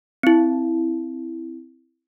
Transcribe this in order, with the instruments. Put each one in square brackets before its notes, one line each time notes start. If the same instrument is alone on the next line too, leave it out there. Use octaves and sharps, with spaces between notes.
[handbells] C4 E4